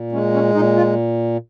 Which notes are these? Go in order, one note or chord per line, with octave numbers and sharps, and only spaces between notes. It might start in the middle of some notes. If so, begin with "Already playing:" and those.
Already playing: A#2
G#3 C#4
C#4
A#2 D#4
F4